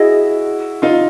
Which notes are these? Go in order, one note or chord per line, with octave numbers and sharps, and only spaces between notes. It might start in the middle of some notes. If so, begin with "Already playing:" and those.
Already playing: E4 F#4 G#4 D#5
D#4 F4